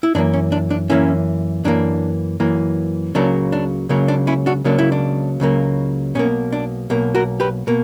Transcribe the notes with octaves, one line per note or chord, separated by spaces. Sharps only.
E4
F#2 E3 A#3 D4
C#4
D4
D4
F#2 E3 A#3 C#4 E4
F#2 E3 A#3 D4
F#2 E3 A#3
C#2 C#3 F#3 A#3 D4
D4
C#2 C#3 F#3 A#3 C#4
D4
C#4 E4
D4 F#4
C#2 C#3 F#3 A#3 D4
E4
D4
C#2 C#3 F#3 A#3
B1 B2 A#3 C#4
D4
B1 B2 A#3
F#4 A#4
G4 B4
B2 A#3